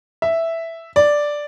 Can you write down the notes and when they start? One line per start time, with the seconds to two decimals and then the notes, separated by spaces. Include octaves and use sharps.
0.22 E5
0.96 D5